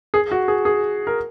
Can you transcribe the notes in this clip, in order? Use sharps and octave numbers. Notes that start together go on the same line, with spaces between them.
G#4
F#4
G#4
G#4
A#4